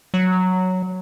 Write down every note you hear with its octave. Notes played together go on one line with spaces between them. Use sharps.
F#3